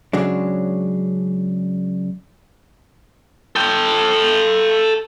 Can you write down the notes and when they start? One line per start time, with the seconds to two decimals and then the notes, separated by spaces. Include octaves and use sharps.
0.13 C#3 F#3 G#3 D4
3.56 A4 G5